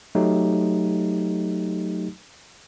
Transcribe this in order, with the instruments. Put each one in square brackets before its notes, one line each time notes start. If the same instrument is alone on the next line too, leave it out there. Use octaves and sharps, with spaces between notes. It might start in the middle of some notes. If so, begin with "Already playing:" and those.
[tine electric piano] F#3 A3 D#4 G4